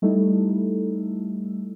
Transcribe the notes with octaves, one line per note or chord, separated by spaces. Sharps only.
G3 A3 D#4 E4 A4